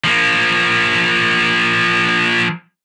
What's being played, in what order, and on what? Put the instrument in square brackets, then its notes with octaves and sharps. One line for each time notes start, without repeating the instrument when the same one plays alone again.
[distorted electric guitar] F3 A#3